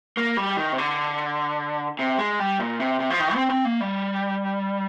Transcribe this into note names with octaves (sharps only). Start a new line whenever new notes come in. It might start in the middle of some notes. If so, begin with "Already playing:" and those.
A#3
G3
D#3
C3
D3
C3
G#3
G3
A#2
C3
C3
F3
D#3
C4
C4
A#3
G3